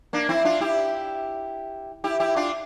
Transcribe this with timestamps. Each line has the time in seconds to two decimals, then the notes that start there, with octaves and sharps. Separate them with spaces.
0.13 A#3 D4
0.29 C4 E4
0.45 D4 F4
0.60 E4 G4
2.04 E4 G4
2.20 E4 G4
2.36 D4 F4